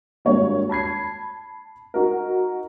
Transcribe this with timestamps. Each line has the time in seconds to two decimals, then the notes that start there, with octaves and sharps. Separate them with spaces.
0.25 G#1 G2 A#3 C#5
0.69 A5 B5 G#6 C7
1.94 D#4 F#4 A#4